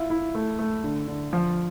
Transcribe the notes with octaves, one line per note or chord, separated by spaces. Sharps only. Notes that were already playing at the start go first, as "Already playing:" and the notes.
Already playing: E4 F4 E5
E4
A3
A3
D3
D3
F3